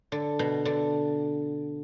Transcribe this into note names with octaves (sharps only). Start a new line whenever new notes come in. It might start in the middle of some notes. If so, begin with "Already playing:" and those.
D3
B2
D3